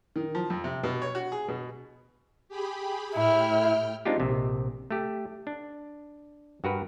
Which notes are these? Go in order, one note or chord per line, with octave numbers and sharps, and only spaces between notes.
D#3
F3
F2
C3
B2
C#5
F#4
G#4
B2
G4 G#4 B5
A2 E4 G5 F6
G#3 C4 D4 D#4 F4 G4
A#1 C3
A3 G4
D4
G2 F#4 A#4 B4